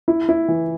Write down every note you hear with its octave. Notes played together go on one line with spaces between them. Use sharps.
E4
E4
E3